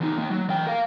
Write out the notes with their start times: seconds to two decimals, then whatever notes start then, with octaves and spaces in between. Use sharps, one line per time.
0.01 E2 D#4
0.18 A#3 D#4
0.31 F#3
0.50 E3 G5
0.67 A#4 F5